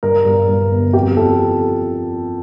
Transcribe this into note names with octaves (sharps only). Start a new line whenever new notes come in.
G2 A#4
G2
G2
G1
F2 G4
F2 A4